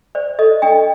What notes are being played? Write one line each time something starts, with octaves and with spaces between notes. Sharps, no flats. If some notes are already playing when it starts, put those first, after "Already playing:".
C5 D5
A4 D#5
D4 D#5 G5